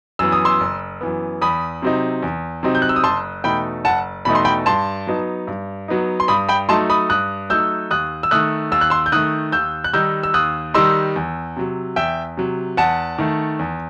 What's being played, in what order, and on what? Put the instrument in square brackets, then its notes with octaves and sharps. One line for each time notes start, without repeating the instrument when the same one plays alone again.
[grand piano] F#2 E3 B3 E6
D#6
C6 E6
F#1
F#2 E3 B3
E2 B5 D#6
C3 F#3 C4 D#4
E2
C3 F#3 C4 D#4
G6
F#6
E6
D#6
F#1 A5 C6
E2 B2 A3 D#4 G5 B5
F#1 F#5 A5
E2 B2 A3 D#4 B5
C6
G5 B5
G2 A5 C6
F#3 B3 D#4
G2
F#3 B3 D#4
C6
G2 B5 D#6
G5 B5
F#3 A3 D#4 A5 C6
B5 D#6
G2 D#6 F#6
F#3 A3 D#4 E6 G6
D#2 D#6 F#6
E6
D#3 A3 D#6 F#6
D#2 E6
F#6
C6 E6
G6
D#3 A3 D#6 F#6
D#2 E6 G6
F#6
D#3 G3 D#4 E6 G6
E6
D#2 D#6 F#6
D#3 G3 D#4 C6 E6
E2
C3 F#3
E2 E5 G5
C3 F#3
E2 F#5 A5
D#3 A3
E2